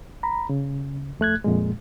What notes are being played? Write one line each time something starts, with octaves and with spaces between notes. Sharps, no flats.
A#5 B5
C#3
F2 A3 F#6 G#6
F2 A#2 G#3